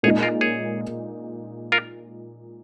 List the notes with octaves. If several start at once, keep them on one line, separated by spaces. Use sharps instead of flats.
A#2 G#3 D#4 G#4 C#5
F4 A#4
G#4 C#5
F4 A#4